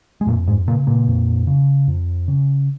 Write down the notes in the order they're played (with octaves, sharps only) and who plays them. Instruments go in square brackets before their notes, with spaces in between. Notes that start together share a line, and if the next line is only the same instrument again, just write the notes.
[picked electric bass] G#3
F2 A#2 A#3
G#2 G#3
A#2 C#3 A#3
A#2 A#3
F2
C#3
F2
C#3